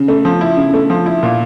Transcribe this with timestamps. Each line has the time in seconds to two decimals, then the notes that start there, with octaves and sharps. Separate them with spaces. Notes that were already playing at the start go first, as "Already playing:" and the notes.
Already playing: C#3
0.08 A3
0.25 F3
0.41 E4
0.57 C#3
0.74 A3
0.90 F3
1.06 E4
1.23 A#2